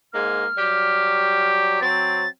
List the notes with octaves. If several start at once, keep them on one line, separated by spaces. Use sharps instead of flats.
G#2 G#3 A#3 F6
F#3 G3 G4
F#3 C4 A6